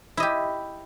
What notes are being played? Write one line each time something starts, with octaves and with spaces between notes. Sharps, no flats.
E4 G4 D#5